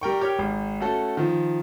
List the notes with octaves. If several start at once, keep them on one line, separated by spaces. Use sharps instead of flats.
G3 A#4 G5 C#6
G4 C#5 F6
G#1
A3 C#4 F#4 A4
D#3 F3